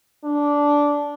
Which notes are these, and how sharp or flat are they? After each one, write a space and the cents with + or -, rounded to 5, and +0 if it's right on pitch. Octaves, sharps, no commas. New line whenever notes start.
D4 -10